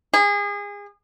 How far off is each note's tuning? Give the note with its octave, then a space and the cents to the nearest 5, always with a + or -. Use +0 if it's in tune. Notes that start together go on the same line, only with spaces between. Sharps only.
G#4 -30